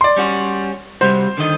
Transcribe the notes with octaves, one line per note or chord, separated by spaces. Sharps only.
D5 C6
G3 C#4 F#4
C3 G3 F#4 C5
D3 D#3 D#5